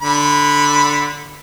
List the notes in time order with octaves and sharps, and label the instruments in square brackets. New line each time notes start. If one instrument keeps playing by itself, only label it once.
[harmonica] D3 B5